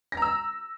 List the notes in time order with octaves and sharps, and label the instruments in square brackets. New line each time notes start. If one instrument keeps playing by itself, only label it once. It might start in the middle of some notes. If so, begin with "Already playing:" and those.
[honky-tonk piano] A#6
A#5
E6